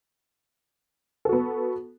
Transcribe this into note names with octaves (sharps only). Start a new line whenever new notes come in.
B3 F#4 A4